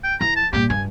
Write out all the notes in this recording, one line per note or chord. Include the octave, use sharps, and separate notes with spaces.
G5
E3 A#5
A5
G2 A#2 G4
G2 G#5